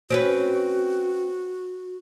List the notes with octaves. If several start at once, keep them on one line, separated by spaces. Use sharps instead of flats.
C4 C#4 F#4 B4